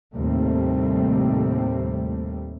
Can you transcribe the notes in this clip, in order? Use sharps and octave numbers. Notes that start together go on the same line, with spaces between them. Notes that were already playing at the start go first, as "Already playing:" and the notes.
D#2 A2 C3 G3 A3 C4